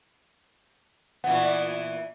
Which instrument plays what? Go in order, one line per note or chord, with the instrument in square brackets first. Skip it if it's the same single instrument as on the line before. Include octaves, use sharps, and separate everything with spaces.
[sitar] A#2 E3 B3 [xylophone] F#5